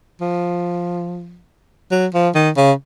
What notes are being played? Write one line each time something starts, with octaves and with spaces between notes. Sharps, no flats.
F3
F#3
F3
D#3
C#3